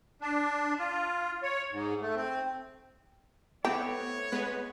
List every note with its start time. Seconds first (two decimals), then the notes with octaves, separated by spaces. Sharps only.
0.21 D4
0.79 F4
1.43 C#5
1.72 G#2
2.02 A3
2.16 C4
3.65 A3 B3 C4 E4 G4 C#5
4.32 G#3 B3 B4